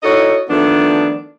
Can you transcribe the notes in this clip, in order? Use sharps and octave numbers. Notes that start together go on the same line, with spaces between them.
D#4 E4 F#4 A4 C#5 D#5
D#3 F3 A3 B3 D4